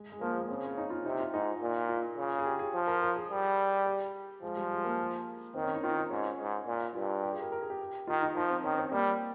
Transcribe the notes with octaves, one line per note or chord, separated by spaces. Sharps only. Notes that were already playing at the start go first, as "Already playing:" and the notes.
Already playing: G#3
G#3
F3 A#3
G#3
A#3
C#3 C4
C#4
D#4
F4
C3 D#4
F4
G#2 D#4
A#2
F4
C#3
G#4
G4
G#4
F3
A#4
A#4
G#4
G3
G4
F3 G#3
G3
G#3
A#3
D#3 C4
C#4
D#4
D#3 F4
D#4
G#2 C#4
G#2
A#2
G2 F4
G4
G#4
A#4
A#4
G#4
G4
D#3 F4
D#4
F3 D#4
C4
D#3 C#4
C4
G3 A#3